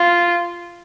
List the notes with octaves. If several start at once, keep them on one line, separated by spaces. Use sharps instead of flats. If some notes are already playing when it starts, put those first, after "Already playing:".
Already playing: F4